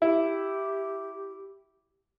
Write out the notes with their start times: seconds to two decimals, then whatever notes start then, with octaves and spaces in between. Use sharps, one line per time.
0.02 E4 G4